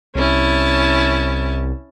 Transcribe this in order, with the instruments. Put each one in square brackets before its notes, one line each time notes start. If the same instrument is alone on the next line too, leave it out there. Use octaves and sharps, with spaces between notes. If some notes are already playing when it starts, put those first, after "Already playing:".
[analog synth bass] C2 [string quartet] C#4 E4 A5